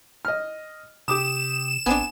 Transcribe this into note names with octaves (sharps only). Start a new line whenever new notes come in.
D#5 F6
C3 G4 D6 D#6 E7
G#1 B3 C4 D4 G#5